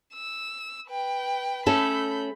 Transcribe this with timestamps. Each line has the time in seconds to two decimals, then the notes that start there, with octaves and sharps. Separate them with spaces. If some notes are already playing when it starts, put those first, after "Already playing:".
0.14 E6
0.89 B4 G5
1.66 A3 C#4 A4 B5 G6